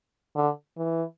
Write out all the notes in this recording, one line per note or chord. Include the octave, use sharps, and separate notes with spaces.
D3
E3